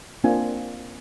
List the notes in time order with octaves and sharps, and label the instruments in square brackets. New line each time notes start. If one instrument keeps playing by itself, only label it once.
[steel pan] A#3 C4 D4 F4 G#5